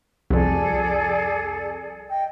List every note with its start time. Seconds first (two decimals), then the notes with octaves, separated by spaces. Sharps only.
0.30 C2 F2 G#4 A4 D5
2.08 D#5 G5